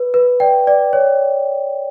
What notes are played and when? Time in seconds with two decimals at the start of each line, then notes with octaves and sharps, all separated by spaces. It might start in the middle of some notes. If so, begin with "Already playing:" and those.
Already playing: B4
0.14 B4
0.40 D5 G5
0.67 D5
0.93 C#5